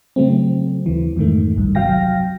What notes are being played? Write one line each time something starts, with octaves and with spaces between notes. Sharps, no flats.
C#3 F#3 A3 C4
D#2 E3
F2 G#2 D#3 A3
G1 C2 G2
C3 F#3 F5 G5 A#6